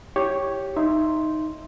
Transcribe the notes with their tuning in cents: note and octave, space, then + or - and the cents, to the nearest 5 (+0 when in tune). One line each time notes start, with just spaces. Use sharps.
E4 +0 G4 +0 C#5 -5
D#4 +0 E5 +15 C6 +0